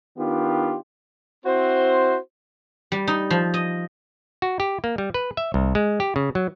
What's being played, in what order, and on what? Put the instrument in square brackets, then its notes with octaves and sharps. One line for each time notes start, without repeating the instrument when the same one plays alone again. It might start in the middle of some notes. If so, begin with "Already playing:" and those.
[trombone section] D#3 B3 D4 F4 G4
[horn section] C4 E4 F#4 C5
[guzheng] G3
D#4
F3
D#5
[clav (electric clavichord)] F#4
G4
A#3
G3
B4
E5
C2
G#3
G4
C#3
F#3